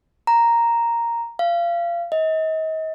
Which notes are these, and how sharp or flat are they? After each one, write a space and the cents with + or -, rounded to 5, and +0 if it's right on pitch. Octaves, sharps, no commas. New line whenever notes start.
A#5 +0
F5 -30
D#5 +35